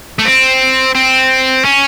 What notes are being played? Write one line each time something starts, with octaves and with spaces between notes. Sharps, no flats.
A3
C4
C4
C#4